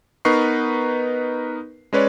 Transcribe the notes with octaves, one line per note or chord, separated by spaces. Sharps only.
B3 D#4 A#4 B4 C#6 C7
G#3 C#4 B4 C#5 D5